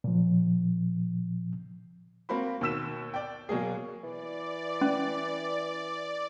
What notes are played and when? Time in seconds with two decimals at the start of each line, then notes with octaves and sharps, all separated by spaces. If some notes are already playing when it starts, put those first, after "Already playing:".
0.04 A#2 F3
2.29 A#3 C4 F#4 B5
2.61 D#2 B2 F#4 E6 B6 E7
3.14 D5 G5
3.49 B2 F#3 A#3 G#4
4.03 E3 D5
4.81 C#4